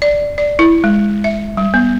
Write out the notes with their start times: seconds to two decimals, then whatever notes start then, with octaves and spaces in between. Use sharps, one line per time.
0.02 D5
0.38 D5
0.59 E4
0.84 G#3
1.24 E5
1.57 G3
1.74 B3